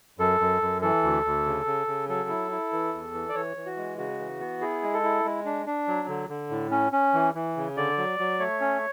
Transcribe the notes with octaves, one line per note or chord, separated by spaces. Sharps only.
F#2 A4
F#2
F#2
E3 A4
D2
D2
C#3
C#3
C#3
F#3 A4
E4
E4
E3
E2
E3
D5
E3 C#5
E3
F#4
G#3
C#3 F#4
E3
B3
E4 G#4
G#3
A4
E4
G#3
D4
D4
F#3
D3
D3
A2
C#4
C#4
E3
E3
C#3
D3 D5
F#3
F#3
A3 C#5
C#4